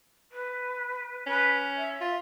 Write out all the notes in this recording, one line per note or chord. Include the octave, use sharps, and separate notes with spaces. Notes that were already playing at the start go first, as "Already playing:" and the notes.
B4
C#4 B4
E5
F4